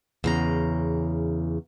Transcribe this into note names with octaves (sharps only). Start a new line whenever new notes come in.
E2 C#3 A#5